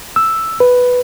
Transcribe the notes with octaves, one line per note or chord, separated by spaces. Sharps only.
E6
B4